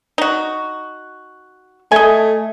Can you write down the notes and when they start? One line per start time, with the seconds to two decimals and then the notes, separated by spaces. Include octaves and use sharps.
0.18 D#4 F#4
1.92 A3 D#5 G#5